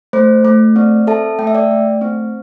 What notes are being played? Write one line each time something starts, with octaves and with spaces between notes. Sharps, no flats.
A3 C5
A3
C4 D5
A4 E5 A5
A3 G5
E5
D5 G5
A3
C4